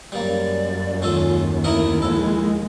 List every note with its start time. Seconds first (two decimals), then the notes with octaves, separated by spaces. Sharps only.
0.12 F#2 G3 A#3 D5
1.02 D#2 G#3 C#4 F4 A4
1.64 A3 E4 A#4 D#5
2.02 A#1 G#3 A4